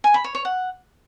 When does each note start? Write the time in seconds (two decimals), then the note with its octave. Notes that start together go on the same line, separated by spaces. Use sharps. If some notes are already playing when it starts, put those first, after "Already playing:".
0.04 G#5
0.14 B5
0.24 C#5
0.35 C#5
0.45 F#5